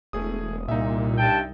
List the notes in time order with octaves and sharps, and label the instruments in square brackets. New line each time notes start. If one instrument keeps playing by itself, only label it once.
[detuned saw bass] E1 [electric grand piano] A3 G#4 D#6
[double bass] C2 [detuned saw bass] A#2 [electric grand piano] D#4 E5
[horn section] G2 G5 A5